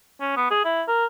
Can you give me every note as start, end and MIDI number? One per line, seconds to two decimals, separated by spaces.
0.21 0.32 61
0.37 0.50 59
0.51 0.62 68
0.65 0.82 64
0.88 1.06 70